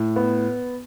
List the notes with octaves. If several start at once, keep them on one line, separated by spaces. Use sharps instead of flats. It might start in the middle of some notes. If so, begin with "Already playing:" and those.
Already playing: A2
B3